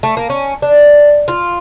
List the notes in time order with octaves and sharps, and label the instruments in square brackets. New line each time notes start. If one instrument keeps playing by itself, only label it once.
[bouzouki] A3
A#3
C#4
D4
F4